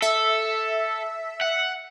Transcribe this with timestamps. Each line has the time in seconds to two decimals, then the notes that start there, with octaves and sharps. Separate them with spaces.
0.02 A4 E5
1.41 F#5